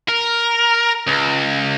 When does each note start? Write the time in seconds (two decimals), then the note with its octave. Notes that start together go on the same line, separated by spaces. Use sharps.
0.08 A#4
1.07 C#2